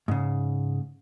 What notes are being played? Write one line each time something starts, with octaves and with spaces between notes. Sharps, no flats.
G#2 C#3